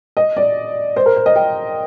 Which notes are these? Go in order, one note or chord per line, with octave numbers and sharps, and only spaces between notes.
D#5
D5
C5
A#4
C5
D#5
G5